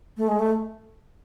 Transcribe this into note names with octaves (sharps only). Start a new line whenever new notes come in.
A3
G#3
A3